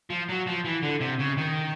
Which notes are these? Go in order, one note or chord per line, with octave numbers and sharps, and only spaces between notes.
F3
F#3
F3
E3
D3
C3
C#3
D#3